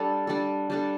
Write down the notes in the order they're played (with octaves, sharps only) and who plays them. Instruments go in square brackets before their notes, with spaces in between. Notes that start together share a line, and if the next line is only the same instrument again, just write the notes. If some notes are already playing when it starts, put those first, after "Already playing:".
Already playing: [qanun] G3 D4 A4
G3 D4 A4
G3 D4 A4